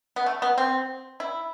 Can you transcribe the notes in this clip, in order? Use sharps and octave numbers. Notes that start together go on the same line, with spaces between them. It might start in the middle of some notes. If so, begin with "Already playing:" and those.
B3
A3
B3
C4
E4